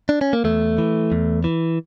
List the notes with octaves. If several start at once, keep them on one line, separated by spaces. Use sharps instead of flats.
D4
C#4
A#3
E2 A3
E3
E2
E3